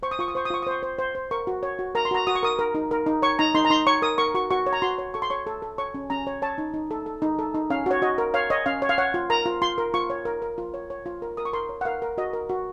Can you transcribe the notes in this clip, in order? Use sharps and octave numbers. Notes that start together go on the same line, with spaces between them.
C5 C#6
D#6
F4 C#6
D#6
C5 C#6
D#6
F4 C#6
D#6
C5 C#6
C5
C5
C5
A#4 C#6
F#4
C#5
F#4
A#4 A#5
C6
F#4 A#5
F#4 D#6
C#6
A#4 D#6
A#4
D#4
A#4
D#4
C#5 C#6
D#4 A#5
D#4 C6
A#5
D#4 C6
C#5 C#6
A#4 D#6
A#4 C#6
F#4 C#6
F#4 C#6
C#5
A#5
F#4 C6
C#5
A4 C#6
C6
C#5 C#6
A4
A4
C#5 C#6
C#4
C#4 A#5
C#5
C#5 A5
D#4
D#4
A4
A4
D#4
A4
D#4
C#4 F5
F#4 C#5
F#4 D#5
A#4
C#5 F5
C#5 D#5
C#4 F5
C#5
F5
C#5 F#5
F4
A#4 A#5
F4
F4 C6
A#4
F4 C#6
C#5
A#4
A#4
F4
C#5
C#5
F4
A#4
A#4 D#6
C#6
A#4 C6
C#5
F#5
A#4 F5
A#4
F#4 D#5
A#4
F#4